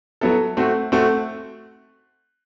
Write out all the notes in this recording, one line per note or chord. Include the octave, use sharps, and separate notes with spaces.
F#3 B3 E4 A4
A3 C4 F#4
A3 C4 F#4